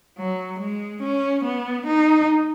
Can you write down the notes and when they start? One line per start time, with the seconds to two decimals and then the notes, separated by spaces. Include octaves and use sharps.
0.18 F#3
0.60 G#3
1.02 C#4
1.45 B3
1.87 D#4